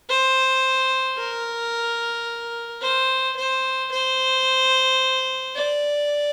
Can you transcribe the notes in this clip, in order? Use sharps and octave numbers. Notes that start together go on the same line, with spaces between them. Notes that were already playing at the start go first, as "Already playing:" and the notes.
C5
A#4
C5
C5
C5
D5